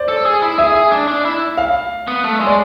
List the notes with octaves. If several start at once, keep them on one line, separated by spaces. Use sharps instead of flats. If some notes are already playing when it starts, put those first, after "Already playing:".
Already playing: C5 D5
A4
G#4
E4
G#4 E5
G#4
D4
D4
E4
F5
B3
A3
G#3
D5